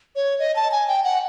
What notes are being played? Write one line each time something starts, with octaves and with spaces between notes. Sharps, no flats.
C#5
D#5
A5
G#5
G5
F#5